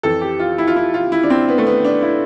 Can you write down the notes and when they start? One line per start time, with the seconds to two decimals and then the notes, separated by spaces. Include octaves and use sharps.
0.03 F2 E3 A4
0.21 G4
0.39 F4
0.58 E4
0.67 F4
0.76 E4
0.94 F4
1.12 E4
1.23 D4
1.30 C4
1.49 B3
1.58 A3
1.67 B3
1.84 D4
2.02 E4